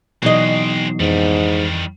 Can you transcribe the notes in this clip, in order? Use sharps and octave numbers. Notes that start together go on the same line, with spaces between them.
B2 E3 F#3 G#3 C4 D#4 D#5
F2 G#2 D#3 E3 G3